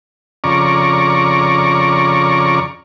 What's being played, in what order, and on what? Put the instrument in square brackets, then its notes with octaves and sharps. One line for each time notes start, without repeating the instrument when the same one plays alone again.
[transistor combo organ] F2 C#3 D5 A#5 C#6